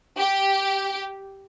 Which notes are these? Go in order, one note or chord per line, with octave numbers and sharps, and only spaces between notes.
G4